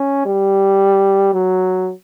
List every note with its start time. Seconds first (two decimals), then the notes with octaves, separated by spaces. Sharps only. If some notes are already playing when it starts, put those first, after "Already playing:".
Already playing: C#4
0.26 G3
1.34 F#3